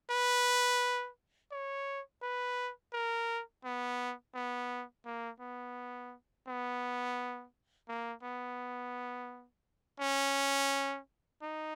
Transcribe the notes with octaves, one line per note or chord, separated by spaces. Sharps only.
B4
C#5
B4
A#4
B3
B3
A#3
B3
B3
A#3
B3
C#4
D#4